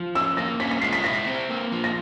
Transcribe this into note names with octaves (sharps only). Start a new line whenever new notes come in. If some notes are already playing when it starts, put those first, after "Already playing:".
Already playing: F3
C#4 E6
A#3 A#6
C#4 B6
B6
G#3 C7
B6
E4 A#6
C4
A#3
F3
A#6